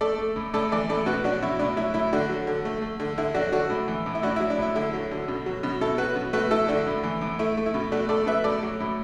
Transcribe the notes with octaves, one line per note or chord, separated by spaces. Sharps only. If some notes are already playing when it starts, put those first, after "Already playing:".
A3 A4 D5
A3
A2
A2 A4 D5
E3 A4 D5
A2 A4 D5
B2 F#4 B4
F#3 D4 F#4
B2 E4
A2 D4
F#3 E4
A2 E4
D3 D4 F#4
F#3
D3
A3
A3
D3
D3 E4
F#3 D4 F#4
D3 D4 F#4
A2
E3
A2
E4
A2 D4 F#4
E4
F#3
D4
A2 E4
D3 E4
F#3
D3
B2
F#3
B2
B2 E4 A4
F#3 F#4 B4
B2
A3 F#4 B4
A3 E4 A4
D3 D4 F#4
A2
E3
A2
A3 E4
A3
E4
B2
A3 D4 F#4
A3 A4 D5
B2 B4 E5
A2 A4 D5
F#3
A2